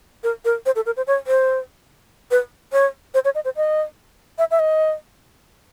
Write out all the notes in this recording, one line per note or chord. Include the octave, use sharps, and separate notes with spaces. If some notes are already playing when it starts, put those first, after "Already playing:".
A#4
A#4
C5
A4
A#4
C5
C#5
C5
B4
C#5
C5
C#5
D#5
C5
D#5
E5
E5
D#5